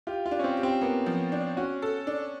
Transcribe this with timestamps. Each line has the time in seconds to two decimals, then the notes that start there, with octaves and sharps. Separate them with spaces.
0.07 F4 G4
0.26 F4
0.31 D4
0.39 C#4
0.44 C4
0.57 G4
0.63 C4
0.81 A#3 B3
1.06 F3
1.32 D4
1.57 C#4 F#4
1.82 A4
2.07 D4